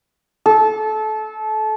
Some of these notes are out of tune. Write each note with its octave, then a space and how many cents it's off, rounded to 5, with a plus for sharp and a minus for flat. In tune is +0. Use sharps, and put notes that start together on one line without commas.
A4 -25